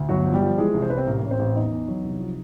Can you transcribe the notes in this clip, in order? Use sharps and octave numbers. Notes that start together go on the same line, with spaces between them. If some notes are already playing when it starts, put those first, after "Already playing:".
Already playing: D2
G1 F#3 F#4
F3
G3 G4
F3
E3 G#3 G#4
C2
C5
C2 B4
C4 C5
A1 A#3 A#4
A1 C#5
C4 C5
A1
E2 D#4 D#5
E2
F#3
C2
F3